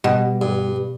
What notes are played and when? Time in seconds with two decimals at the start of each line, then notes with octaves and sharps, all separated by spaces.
0.04 B2 G3 G4
0.41 G2